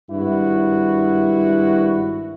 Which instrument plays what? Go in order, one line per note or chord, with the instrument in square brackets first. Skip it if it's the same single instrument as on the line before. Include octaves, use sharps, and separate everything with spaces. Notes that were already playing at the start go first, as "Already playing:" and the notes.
[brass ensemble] G#1 G2 E4 F#4